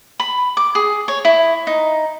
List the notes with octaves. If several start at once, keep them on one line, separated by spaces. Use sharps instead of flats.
B5
D6
G#4
C#5
E4
D#4